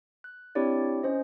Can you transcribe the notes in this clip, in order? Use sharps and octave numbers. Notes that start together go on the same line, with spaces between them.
F#6
C4 D4 E4 G4 C#5 D5
C#4 C5 D#5